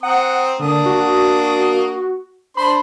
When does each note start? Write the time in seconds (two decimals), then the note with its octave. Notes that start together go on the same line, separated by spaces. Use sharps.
0.03 C4 F#5 A#5 D#6
0.60 D3 A#3 D4 D#6
0.86 F#4
2.57 D4 C5 B5 C6